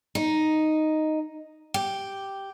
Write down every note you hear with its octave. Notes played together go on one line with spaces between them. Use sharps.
D#4
G4